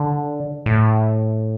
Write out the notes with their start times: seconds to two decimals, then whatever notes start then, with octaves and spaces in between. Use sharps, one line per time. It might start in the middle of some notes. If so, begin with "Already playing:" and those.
Already playing: D3
0.66 A2